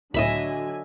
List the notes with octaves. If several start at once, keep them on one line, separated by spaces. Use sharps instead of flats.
C#2 A2 D3 F#3 D#5 E5 G#5 B5